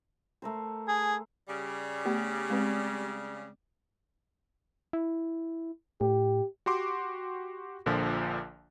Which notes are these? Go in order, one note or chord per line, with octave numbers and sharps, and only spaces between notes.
A3 A#4 C5
G#4 G#5
C#3 G3
A3 B3 G4
G#3 C4 B4
E4
A2 G4
F#4 G4 C6 D6
A#1 A#2 D3 F3